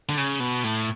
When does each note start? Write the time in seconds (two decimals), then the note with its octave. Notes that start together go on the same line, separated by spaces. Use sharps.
0.09 D3
0.18 C#3
0.40 B2
0.64 A2